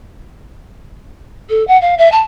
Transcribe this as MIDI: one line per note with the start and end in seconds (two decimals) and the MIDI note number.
1.50 1.66 69
1.68 1.80 78
1.82 1.95 77
1.98 2.10 76
2.12 2.21 81